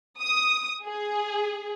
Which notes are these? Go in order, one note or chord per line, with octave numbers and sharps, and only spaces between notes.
D#6
G#4